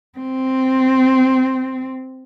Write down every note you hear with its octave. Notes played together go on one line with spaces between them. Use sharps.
C4